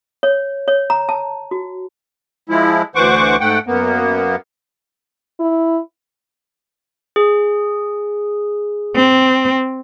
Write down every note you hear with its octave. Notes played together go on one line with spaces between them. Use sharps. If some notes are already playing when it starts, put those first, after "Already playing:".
C#5
C#5
A#5
A5
F#4
F3 G#3 E4
D2 E3 C5 F#5 C#6 D6
G#2 A3 F#5 G5
F#2 A#3 B3
E4
G#4
C4